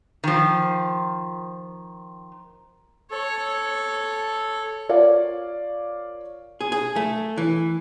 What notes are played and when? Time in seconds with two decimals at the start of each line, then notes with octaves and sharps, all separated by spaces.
0.24 D#3 F3
3.11 A4 C#5
4.89 F4 A#4 C#5 D5 F5
6.61 G#4
6.72 G#4
6.96 A3
7.38 E3